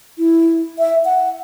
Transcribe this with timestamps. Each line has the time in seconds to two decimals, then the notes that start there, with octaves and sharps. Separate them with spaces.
0.18 E4
0.79 E5
1.05 F#5